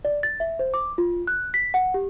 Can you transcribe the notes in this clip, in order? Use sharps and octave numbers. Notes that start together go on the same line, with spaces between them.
D5
A6
E5
C5
D6
F4
F#6
B6
F#5
G4